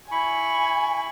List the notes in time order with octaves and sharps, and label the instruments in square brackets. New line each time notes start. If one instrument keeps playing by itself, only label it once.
[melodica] E4 B5 C#6 [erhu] G#5